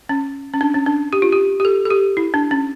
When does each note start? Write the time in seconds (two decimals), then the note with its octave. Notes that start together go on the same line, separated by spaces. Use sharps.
0.09 C#4
0.54 C#4
0.61 D4
0.74 C#4
0.86 D4
1.13 G4
1.22 F4
1.32 G4
1.60 G4
1.65 A4
1.85 A4
1.90 G4
2.17 E4
2.34 D4
2.51 C#4